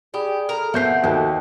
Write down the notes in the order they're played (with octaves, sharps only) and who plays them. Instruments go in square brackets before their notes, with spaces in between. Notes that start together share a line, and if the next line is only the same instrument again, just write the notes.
[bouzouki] G4 [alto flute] G#4 [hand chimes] D5 B5 D#6
[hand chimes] A4 F6 [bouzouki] A#4
[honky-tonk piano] B2 G6 C7 [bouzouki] F#3 C4 [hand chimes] E5 B6
[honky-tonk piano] D#2 [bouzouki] D3 [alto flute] F#4 [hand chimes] C5 D#5